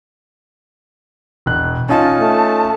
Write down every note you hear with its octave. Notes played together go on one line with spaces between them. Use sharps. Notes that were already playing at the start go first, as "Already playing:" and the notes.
E1 F#6
C#4 D#4 F4 A5
A3